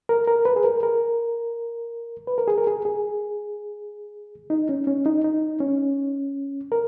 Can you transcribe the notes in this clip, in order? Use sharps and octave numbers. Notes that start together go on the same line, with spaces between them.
A#4
A#4
B4
G#4
A#4
A#4
B4
A#4
G#4
A#4
G#4
G#4
D#4
C#4
C#4
D#4
D#4
C#4
A#4